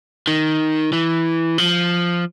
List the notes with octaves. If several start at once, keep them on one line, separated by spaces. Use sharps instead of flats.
D#3
E3
F3